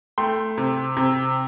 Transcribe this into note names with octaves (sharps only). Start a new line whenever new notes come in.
A3 G5 C6
C3
C3